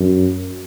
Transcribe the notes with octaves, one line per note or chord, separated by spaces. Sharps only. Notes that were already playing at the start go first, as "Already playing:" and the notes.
Already playing: F#2